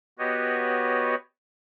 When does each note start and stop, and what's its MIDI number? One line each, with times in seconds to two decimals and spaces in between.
0.19 1.15 59
0.19 1.15 66
0.19 1.15 67
0.19 1.15 71
0.19 1.15 73
0.19 1.15 75